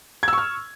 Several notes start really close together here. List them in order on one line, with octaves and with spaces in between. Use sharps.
G#6 E6 C#6 F6